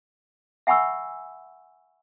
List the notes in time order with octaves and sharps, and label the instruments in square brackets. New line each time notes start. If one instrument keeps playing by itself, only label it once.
[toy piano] E5 F#5 G#5 B5 C#6 E6